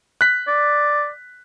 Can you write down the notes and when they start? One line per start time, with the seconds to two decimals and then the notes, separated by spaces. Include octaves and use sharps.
0.21 F#6 B6
0.48 D5